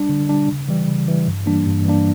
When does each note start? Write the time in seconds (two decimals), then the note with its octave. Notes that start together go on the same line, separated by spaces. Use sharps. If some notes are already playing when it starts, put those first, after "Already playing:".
Already playing: G3 D4
0.09 D3
0.29 G3 D4
0.48 C#3
0.69 E3 G3
0.88 C#3
1.08 E3 G3
1.27 G2
1.46 E3 G3 A#3 D4
1.66 G2
1.85 E3 G3 A#3 D4